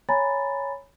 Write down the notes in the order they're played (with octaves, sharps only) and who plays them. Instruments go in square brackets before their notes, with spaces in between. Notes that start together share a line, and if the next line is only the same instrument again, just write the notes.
[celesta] C#5 G#5 A#5 B5 A6